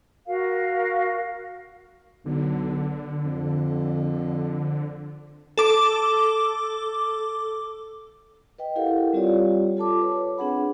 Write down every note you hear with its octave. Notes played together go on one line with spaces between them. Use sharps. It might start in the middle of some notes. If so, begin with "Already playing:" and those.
F#4 A#4 F5
B1 D3
F2
A4 D6
B4 D#5 G5
E4 G4 A4 A#4 F5 F#5
G3 C4 F4 G4 C#5 D5
F4 A4 A5 D6
B4 C#5
C4 D4 G#4 F#5 B5